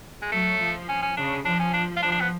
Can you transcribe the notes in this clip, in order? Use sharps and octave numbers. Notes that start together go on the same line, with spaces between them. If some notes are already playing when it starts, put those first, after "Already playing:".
G#3
F#3 A3
F3
C#4
C#4
C#3 D4
F3 D4
C#4
D4
F4
F3 D4
D4
B3